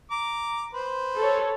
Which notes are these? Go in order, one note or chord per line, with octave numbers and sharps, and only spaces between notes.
A#5 D6
B4 C5
A4 C#5